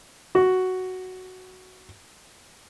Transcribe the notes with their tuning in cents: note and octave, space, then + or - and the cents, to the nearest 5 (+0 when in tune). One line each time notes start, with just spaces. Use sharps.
F#4 +5